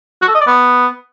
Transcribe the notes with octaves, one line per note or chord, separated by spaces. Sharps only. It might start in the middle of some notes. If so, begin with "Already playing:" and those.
F#4
A4
D#5
D5
B3